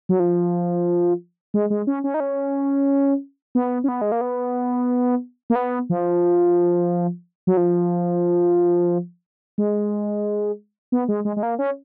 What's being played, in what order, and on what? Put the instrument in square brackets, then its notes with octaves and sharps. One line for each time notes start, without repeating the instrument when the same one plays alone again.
[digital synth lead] F#3
F3
G#3
G#3
C#4
C#4
D#4
C#4
B3
C#4
B3
G#3
A#3
B3
A#3
B3
F3
F#3
F3
G#3
B3
G#3
G#3
G#3
A#3
C#4